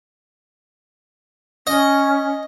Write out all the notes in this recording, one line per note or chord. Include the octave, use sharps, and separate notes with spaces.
C#4 D#5